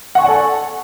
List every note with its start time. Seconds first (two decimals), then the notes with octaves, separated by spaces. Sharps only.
0.15 F#5
0.18 C#6
0.22 G#5
0.25 D5
0.28 A4